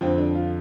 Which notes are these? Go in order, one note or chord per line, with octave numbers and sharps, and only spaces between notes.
F2 D3 F3 C4
D4
F4